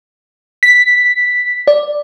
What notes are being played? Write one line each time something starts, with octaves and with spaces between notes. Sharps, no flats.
B6
D5